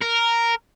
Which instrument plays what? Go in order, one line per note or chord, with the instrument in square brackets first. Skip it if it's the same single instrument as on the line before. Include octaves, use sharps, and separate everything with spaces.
[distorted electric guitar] A#4